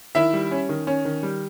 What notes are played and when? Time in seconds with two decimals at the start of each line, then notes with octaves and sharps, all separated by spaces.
0.15 D#3 E4 E5
0.33 G3
0.51 C#4
0.69 D#3
0.87 C#4
1.05 D#3
1.23 G3